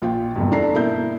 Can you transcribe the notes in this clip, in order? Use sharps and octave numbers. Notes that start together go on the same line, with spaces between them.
A#1 F4 G5
F#1 E2 G2
E3 D4 A4 A#5 C7
B2 A#3 E4 G6